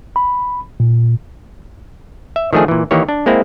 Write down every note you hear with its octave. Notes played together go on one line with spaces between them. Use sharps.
B5
A#2
E5
D#3 F3 A3 D4 G#4
A#2 E3
D#3 E3 A#3 G4 C#5
D4
G#3 A#3 C4 E4